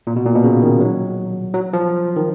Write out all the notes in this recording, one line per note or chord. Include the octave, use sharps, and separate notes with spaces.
A#2
B2
A#2
B2
C#3
D#3
F#3
F#3
F3
D#3